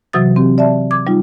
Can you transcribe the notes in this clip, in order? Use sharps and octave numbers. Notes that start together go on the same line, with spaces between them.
C3 E3 F#3 F#4 D#6 A6
C4 G4
D5 E5 A5
D6 G#6
G3 D#4 F4